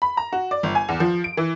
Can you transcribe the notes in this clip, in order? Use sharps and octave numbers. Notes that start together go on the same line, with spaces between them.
B5
A#5
F#4
D5
G1
G#5
E2
F3
D7
E3